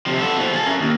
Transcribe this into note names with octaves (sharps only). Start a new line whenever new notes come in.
C3 F3
B3 A4
B2 F3
G#4 A5
C#4 A#4
D#2